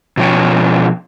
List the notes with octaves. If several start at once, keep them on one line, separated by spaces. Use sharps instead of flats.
B2 F3 C#4 C#5 G5